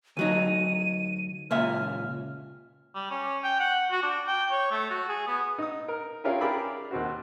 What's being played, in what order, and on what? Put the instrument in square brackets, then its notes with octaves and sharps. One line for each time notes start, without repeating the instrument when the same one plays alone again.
[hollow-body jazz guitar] D2 F#3 D#4 [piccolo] D#7
[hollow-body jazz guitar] C#2 A#2 E5 [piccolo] F6
[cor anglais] G3
C#4
G5
F#5
F#4
D4
G5
C#5
A3
F#4
G#4
B3
[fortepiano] D#4 D#6
A#4
C#4 E4 F4 G4 G#4 A#4
G4 G#4 A#4 D5 B5 E6
D#2 C4 F#4